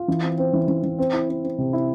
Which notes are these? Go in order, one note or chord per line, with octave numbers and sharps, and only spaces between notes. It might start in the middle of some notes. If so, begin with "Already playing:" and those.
Already playing: F4
E3
C4
C4
E3
E3
E3
C4
E4
C4
C4
C3
E4